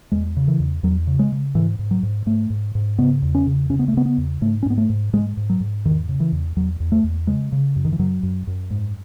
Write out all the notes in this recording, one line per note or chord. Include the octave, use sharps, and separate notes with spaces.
E2 G#3
C#3
E3
E2
E2 F#3
C#3
G#3
C#3
G#2 E3
G#2
F#3
G#2
G#2 A3
G#2
G#2
C#3 B3
E2
C#4
C#3
C#3 C#4
B3
A3
C#3 B3
B3
E2
G#2 A3
C#4
G#2 B3
A3
G#2
G#2 G#3
G#2
F#3
G#2
E2 D#3
C#3
E3
E2
E2 F#3
E2
A3
E2
C#3 G#3
C#3
F#2
D#3
E3
F#2 F#3
F#2
F#2
G#2